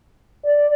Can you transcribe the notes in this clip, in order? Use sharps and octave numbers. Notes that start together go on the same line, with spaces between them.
D5